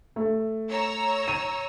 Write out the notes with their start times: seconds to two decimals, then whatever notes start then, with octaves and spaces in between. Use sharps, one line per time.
0.16 A3
0.69 C#5 A#5 E6
1.28 D#7